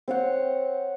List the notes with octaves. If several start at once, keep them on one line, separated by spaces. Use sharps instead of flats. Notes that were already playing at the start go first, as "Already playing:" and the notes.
C4 C5 C#5 F#5